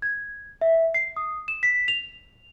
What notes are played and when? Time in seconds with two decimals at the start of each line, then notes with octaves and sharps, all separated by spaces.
0.02 G#6
0.61 E5
0.94 C7
1.16 D#6
1.48 E7
1.63 B6
1.88 F7